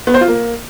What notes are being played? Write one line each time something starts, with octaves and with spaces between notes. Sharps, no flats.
B3
C5
F4
A#3